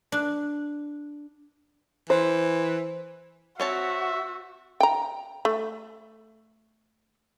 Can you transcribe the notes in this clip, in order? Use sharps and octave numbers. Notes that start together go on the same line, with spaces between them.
D4
E3 C5
C4 F#4 C#5 E5 A5
G5 A#5
A3